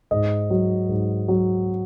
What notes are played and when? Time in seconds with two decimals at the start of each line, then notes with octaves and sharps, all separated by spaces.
0.11 G#2 D#5
0.50 F#3
0.89 G#2
1.28 F#3